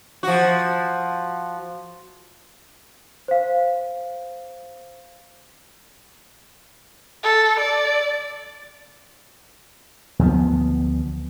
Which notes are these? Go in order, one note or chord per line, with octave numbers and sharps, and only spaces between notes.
F3 F#4
C5 F5
A4
D5
D2 F3 B3